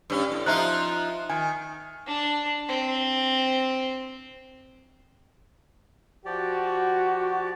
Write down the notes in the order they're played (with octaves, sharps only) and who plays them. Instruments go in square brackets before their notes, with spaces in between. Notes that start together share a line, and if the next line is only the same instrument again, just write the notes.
[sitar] G2 C#4
A2
[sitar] F3 D#4 F4 [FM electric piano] E5 A#5 F#6
[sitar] D#3 [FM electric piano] G#5
[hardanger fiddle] D4
C4
[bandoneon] F3 G4 D5 [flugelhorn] F#4